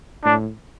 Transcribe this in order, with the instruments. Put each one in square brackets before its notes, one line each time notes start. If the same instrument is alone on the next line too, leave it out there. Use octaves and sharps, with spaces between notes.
[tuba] A2 [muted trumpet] D4